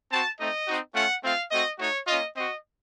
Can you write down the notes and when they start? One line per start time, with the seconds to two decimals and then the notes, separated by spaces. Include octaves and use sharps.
0.10 C4 F#4 A5
0.38 A3 C4 D#4 D#5
0.66 C4 D#4 F#4
0.94 A3 C#4 F4 F#5
1.23 A3 C4 F4 F5
1.50 A3 C4 F#4 D#5
1.78 A3 D#4 F#4 C#5
2.07 A#3 C#4 F4 D#5
2.34 C4 F#4 D#5